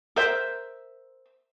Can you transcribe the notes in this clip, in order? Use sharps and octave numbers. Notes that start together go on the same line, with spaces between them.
A#4 C5 E5